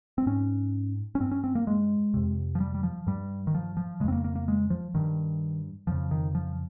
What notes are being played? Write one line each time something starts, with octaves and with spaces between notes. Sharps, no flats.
C4
G#2 C#4
C#4
G2 C4
C#4
C4
A#3
G#3
F2 C3
F3
G3
G3
F3
G2 G3
D#3
F3
F3
F2 C#3 G#3 C4
A#3
A#3
A#3
G#3
F3
G2 D#3
F2 C#3 F3
D#3
F3